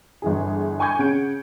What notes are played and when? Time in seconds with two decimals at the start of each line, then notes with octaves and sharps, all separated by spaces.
0.22 G1 E3 G#4
0.79 G5 G#5 C#6 D6 G6 G#6
0.99 C#3 F#5 D7